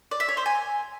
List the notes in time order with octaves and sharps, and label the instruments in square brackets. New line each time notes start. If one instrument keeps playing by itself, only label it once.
[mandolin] D5
E5
C#5
C5
G#5